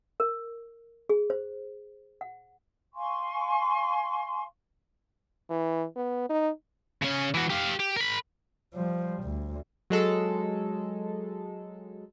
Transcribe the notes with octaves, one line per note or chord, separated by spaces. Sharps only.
A#4
G#4
C5
F#5
F5 G#5 C6 C#6
E3
B3
D#4
C#3 C#4
E3 F#4
G4 F5
G4
A#4 B5
F3 G3
D2
F#3 G#3 A4